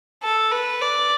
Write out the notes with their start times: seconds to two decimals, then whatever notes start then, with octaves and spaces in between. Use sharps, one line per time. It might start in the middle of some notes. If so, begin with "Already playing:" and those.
0.24 A4
0.52 B4
0.81 D5